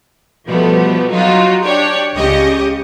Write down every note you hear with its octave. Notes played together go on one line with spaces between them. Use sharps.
B2 F3 G3 A3 B3
F#3 D#4 F4 F#4
D4 G4 C#5 D5
C#2 C#3 G4 D#5 C#6